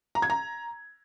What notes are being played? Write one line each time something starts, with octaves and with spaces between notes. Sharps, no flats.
A#5
G#6
A#5